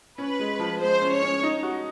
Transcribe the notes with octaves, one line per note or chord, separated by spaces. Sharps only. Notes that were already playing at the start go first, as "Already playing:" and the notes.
C#4 B4
G#3
F3
G#3 C5
C#4
C#5
C#4
D#4
F#4